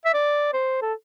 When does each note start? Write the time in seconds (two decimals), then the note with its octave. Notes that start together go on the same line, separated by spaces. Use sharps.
0.05 E5
0.14 D5
0.53 C5
0.82 A4